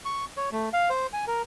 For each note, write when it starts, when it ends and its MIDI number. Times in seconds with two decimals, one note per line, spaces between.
0.05 0.25 85
0.37 0.49 73
0.52 0.69 57
0.73 0.89 77
0.90 1.07 72
1.13 1.25 80
1.27 1.42 70